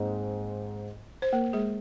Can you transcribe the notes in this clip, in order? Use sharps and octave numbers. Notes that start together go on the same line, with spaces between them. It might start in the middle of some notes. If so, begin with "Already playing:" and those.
Already playing: G#2 G#3 A#3 C4 D#4
C5
A#3 A#4
G#3 G#4